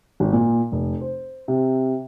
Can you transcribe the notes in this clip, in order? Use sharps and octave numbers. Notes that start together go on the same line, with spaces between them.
G#1
A#2
F1
C5
C3